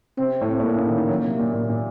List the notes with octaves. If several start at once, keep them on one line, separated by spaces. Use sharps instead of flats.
C3 C4
A2
A2
A#2 A#3
C#3
D#3
D#3
F#3
C3
A#2
A#2
A#2